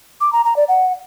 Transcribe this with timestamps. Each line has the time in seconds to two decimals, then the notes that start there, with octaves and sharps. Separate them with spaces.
0.21 D6
0.33 A#5
0.45 A#5
0.56 D5
0.68 F#5